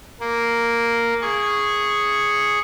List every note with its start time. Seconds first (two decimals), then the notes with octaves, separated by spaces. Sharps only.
0.21 A#3
1.22 G#4 C#6